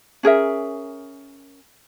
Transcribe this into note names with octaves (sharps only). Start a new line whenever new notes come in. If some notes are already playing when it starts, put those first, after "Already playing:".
C#4 G#4 A#4 E5